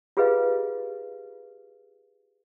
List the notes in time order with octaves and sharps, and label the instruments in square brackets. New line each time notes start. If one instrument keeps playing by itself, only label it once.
[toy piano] F4 G4 G#4 B4 D#5 F5